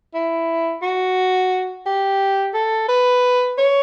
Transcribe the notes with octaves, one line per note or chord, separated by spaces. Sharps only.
E4
F#4
G4
A4
B4
C#5